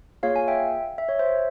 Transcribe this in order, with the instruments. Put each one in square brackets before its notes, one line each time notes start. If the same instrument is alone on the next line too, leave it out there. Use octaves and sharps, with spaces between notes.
[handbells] A#3 F4 G#4 C#5 F5
F5 G#5
E5 G5
E5
C#5
C5 E5